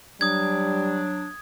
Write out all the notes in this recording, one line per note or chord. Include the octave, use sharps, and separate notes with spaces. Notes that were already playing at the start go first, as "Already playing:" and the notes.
F#3 G3 D4 D#6 G#6